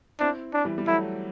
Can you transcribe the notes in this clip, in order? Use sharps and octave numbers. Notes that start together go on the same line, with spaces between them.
C4 D4 E4
D4
E3 G3
G3
F#3 A3 E4